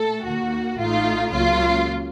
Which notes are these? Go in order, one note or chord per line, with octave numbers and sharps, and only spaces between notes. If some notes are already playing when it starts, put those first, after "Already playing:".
Already playing: A#2 A3 A4
D#2 D#3 A#3 F#4
A1 A2 A3 D#4 F4
C#2 C#3 F#3 A#3 F4